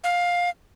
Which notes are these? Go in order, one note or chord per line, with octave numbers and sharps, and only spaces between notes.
F5